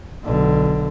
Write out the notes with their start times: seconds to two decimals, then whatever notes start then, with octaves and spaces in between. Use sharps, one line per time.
0.24 B1 D3